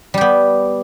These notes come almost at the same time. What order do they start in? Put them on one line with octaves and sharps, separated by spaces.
G3 G4 B3